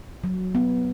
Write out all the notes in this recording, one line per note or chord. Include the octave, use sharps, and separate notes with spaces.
F#3
B3